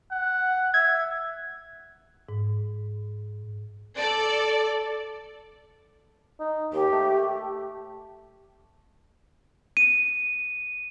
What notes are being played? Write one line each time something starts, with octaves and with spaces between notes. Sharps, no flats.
F#5
E5 G#6
G#2
A4 D5
D#4
D#2 G4
A3
D#7